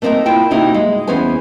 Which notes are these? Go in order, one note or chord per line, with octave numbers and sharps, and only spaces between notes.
A3 A#3 C4 D4 D#4 A#4
E4 F4 C5 G5
C3 A#3 D#4 E4 F#4 G4
G#3
E2 E3 B3 C#4 C5 G#5